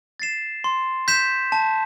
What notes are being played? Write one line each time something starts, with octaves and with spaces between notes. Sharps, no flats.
A6 C7 E7
C6
G6 B6 E7
A5